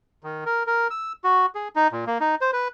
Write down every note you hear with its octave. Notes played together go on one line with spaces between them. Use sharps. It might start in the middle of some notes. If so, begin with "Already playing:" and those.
D#3
A#4
A#4
E6
F#4
G#4
D#4
A#2
A#3
D#4
C5
B4